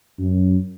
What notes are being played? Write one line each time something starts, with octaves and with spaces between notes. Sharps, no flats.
F#2